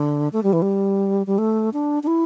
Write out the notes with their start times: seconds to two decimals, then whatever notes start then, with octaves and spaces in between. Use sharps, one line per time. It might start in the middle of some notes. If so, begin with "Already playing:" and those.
Already playing: D3
0.33 A3
0.43 G3
0.53 E3
0.62 G3
1.27 G3
1.38 A3
1.73 D4
2.03 D4
2.07 E4